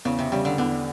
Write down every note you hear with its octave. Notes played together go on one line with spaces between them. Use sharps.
E2 C#3
C3
C#3 G3
D3
E2 D3